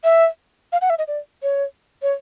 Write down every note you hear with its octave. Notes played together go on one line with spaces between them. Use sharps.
E5
F5
F#5
E5
D#5
D5
C#5
C#5